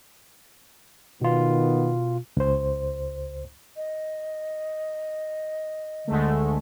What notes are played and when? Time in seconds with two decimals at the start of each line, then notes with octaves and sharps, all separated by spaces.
1.21 B2 D#3 B3 F4
2.37 C#2 C5
3.76 D#5
6.08 D2 D3 G#3 A3